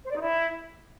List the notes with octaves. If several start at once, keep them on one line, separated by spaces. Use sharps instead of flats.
C5
D5
D#4
E4